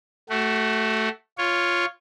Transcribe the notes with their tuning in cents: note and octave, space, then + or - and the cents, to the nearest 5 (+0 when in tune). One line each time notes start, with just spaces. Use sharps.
A3 +0 F#4 +30
F4 +0 C#5 +0